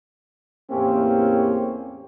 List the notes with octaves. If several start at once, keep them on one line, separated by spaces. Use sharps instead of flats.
E2 A2 A#3 C4 C#4 G4